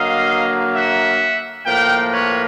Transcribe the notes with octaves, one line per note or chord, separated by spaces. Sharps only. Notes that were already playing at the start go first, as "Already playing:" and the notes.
Already playing: D3 F#3 A#3 D#5 F5
E5 F#5
A2 F3 A#3 F5 G5
B4 C#5